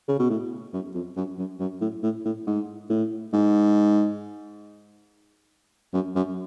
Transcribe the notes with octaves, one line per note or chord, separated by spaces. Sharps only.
C#3
B2
A2
F#2
F2
F#2
F#2
F#2
A2
A2
A2
G#2
A2
G#2
F#2
F#2